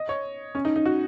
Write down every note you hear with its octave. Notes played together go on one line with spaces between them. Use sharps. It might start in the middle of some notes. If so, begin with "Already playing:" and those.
Already playing: D#5
C#5
C#4
D#4
D#4
F#4